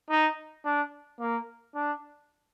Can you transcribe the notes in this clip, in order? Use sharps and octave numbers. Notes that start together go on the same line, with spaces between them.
D#4
D4
A#3
D4